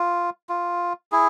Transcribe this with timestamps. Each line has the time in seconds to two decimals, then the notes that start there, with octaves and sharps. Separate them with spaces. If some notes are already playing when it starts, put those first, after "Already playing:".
Already playing: F4
0.49 F4
1.12 E4 G#4